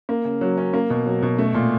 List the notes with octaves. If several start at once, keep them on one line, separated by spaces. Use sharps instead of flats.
A#3
C#3
F#3
C#4
A#3
B2
F#3
B2
A3
A#2